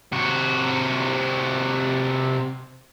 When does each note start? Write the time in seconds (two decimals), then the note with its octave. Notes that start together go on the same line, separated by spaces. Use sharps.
0.12 C3 F#4